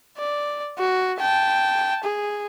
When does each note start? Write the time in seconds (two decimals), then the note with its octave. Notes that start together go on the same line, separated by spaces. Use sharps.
0.18 D5
0.78 F#4
1.19 G5 A5
2.04 G#4